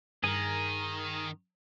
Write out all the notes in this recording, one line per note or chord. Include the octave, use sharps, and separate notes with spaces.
G2 D#3 G#4 A#4